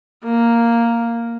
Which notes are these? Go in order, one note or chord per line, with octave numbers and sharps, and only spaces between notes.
A#3